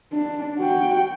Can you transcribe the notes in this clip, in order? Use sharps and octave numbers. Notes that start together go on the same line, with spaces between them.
D4
F#4 G5